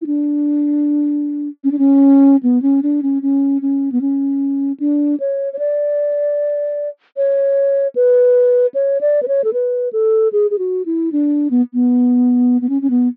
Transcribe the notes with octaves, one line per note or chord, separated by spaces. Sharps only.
E4
D4
C#4
D4
C#4
B3
C#4
D4
C#4
C#4
C#4
B3
C#4
D4
C#5
C#5
D5
C#5
B4
C#5
D5
B4
C#5
A4
B4
A4
G#4
G#4
F#4
E4
D4
B3
B3
B3
C#4
C#4
B3